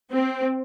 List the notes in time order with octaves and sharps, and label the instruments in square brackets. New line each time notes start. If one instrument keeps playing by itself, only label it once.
[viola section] C4